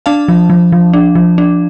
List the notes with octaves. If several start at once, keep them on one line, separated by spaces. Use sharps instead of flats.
D4 F5 A5
F3
F3
F3
D4
F3
D4